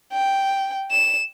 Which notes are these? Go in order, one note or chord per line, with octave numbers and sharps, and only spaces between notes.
G5
E7